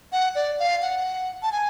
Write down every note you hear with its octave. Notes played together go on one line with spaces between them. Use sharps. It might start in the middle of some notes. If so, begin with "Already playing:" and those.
F#5
D5
F5
F#5
A5
G#5